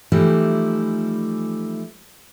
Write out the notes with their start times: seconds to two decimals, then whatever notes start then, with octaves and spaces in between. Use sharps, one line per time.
0.12 E3 F3 G3 A3 D#4 E4